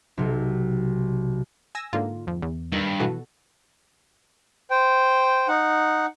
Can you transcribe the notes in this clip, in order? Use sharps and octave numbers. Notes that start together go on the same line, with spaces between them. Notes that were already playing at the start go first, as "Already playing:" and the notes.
B1 C3
G#5 E6 A#6
G#2 D3 A#3 F4
F2
E2
G2 D#3 E6
B2 E3 F#4 A4
C5 G5
D#4 F#5